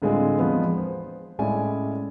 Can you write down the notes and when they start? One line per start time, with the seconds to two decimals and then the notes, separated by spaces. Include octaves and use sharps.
0.02 A2 D3 G#3 C4 F4 G#4
0.39 E2 C3 F3 G#3 B3
0.78 C5
1.39 A2 G#3 C#4 E4 D5 G#5